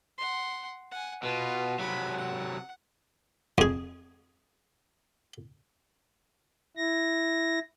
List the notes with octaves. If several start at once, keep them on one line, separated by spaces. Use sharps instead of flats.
F#5 C6
F#5 G#5
B2 F4 B4
C3 F#3 B5
F#5
F2 G#4
E4 A#6